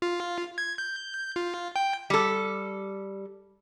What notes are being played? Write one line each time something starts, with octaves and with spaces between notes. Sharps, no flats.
F4
G#6
G6
F4
G5
G3 A4